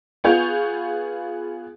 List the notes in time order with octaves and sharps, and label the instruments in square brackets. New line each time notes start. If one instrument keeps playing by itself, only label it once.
[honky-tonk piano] B3 F4 G#4 C#6 G6 F7